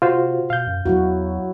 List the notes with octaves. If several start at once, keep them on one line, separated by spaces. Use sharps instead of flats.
C3 F4 F#4 C5
B2 F5 G6
F#2
E2 F#3 E4 F#4